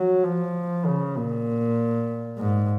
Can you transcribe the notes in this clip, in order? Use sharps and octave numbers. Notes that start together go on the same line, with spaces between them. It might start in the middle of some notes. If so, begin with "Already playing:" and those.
Already playing: F#3
F3
C#3
A#2
G#2